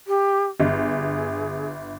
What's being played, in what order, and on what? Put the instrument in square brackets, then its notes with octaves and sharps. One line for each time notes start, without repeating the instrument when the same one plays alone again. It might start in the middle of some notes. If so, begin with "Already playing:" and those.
[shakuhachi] G4
[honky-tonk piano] G1 [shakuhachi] G#4